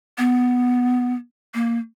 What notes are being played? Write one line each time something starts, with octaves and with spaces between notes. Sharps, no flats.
B3
A#3